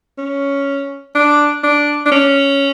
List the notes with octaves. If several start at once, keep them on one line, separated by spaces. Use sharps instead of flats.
C#4
D4
D4
D4
C#4